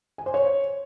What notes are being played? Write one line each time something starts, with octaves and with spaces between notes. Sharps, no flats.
G#5
C5
C#5